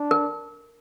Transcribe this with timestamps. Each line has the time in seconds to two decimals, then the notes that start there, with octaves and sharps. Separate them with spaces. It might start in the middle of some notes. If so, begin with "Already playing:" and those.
Already playing: D4
0.11 A#4